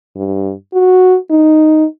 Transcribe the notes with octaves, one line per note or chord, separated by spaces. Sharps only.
G2
F#4
D#4